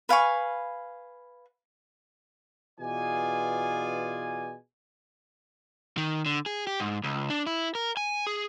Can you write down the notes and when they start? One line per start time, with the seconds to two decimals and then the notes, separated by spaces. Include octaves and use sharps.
0.09 B4 F5 G#5 C#6
2.79 B2 E3 F4 G#4 D5 G#5
5.97 D#3
6.26 D3
6.46 G#4
6.67 G4
6.80 G#2
7.04 C#2
7.30 D4
7.47 E4
7.75 A#4
7.97 G#5
8.27 G#4